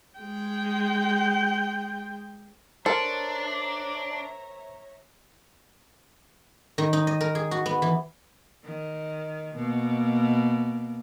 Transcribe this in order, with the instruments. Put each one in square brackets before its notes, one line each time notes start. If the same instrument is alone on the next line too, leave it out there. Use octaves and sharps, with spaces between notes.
[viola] G#3 G5
[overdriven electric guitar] D4 [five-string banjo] A4 [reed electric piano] A#4 C5 [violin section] C#5 E5 A#5
[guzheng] D#3
D#4
D#5
A#4
G#4
F#4
B3
E3
[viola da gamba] D#3
B2 A#3